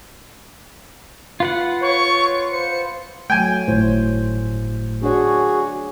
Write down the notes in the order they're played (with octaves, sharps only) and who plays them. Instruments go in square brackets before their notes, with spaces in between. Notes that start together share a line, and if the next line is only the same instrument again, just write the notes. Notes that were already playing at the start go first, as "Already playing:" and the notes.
[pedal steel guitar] F4 B4 F#5
[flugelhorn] C#5 [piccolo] C#6
[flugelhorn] C5 [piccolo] C#7
[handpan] F#3 A3 [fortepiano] G5 G#5
[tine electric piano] G1 A2 [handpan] C5
[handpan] D4 C#5 [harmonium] F#4 G#4